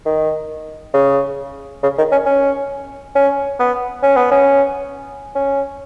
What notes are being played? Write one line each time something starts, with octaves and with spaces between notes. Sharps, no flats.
D#3
C#3
C#3
D#3
C#4
C#4
C#4
B3
C#4
B3
C#4
C#4